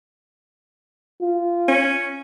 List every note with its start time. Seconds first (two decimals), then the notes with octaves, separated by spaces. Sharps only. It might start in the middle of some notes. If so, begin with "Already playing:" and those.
1.21 F4
1.68 C#4